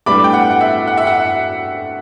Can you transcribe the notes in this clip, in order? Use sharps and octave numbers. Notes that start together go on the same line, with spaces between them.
A2 G3 B3 D4 B5 D6
G5
F#5
F#5
E5
F#5
E5
F#5